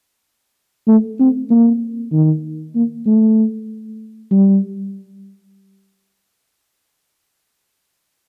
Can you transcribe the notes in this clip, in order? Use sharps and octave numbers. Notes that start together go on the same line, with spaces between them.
A3
C4
A#3
D#3
A#3
A3
G3